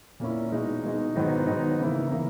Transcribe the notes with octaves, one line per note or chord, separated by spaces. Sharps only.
A#2 A#3 C#4 E4
B2 G#3 D#4
B2 G#3 D#4
G#2 D#3 F#3 B3 D#4
G#2 D#3 F#3 B3 D#4
C#3 E3 A#3 E4
C#3 E3 A#3 E4